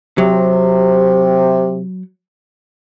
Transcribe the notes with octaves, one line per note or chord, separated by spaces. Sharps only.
C3 F#3